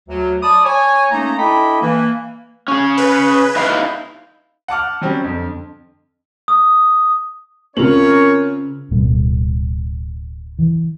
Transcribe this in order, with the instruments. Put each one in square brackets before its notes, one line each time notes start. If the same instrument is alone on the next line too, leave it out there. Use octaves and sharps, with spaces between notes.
[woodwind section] D2 F#3
D5 A5 B5 D6 D#6
C#5 G#5
A3 A#3 C#4 D#4 A#5
D4 E4 A4 D#5 G5 B5
E3 A#3
[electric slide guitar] C#4 G#4
[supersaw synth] B4
[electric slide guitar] D#4 E4 F5
[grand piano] F#5 A5 D6 F6
F#3 G3 C4 C#4
F2 D3
[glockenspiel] D#6
[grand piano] C#3 F7 F#7 [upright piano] C4 F4 [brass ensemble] C#4 A#4 C#5
[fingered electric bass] D1 B2 G3
E3